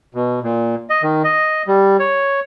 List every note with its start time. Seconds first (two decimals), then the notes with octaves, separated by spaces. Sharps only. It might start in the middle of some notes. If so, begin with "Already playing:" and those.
0.15 B2
0.43 A#2
0.90 D#5
1.03 D#3
1.24 D#5
1.67 G3
2.00 C#5